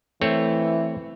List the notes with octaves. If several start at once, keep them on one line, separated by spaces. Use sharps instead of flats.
E3 A3 C4 C#5